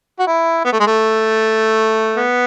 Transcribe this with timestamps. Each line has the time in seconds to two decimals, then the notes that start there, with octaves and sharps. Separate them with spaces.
0.19 F#4
0.27 E4
0.65 B3
0.72 A3
0.80 G#3
0.87 A3
2.17 B3